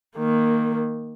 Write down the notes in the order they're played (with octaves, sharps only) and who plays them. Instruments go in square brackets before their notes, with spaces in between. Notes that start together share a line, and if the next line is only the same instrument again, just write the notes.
[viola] D#3 A#3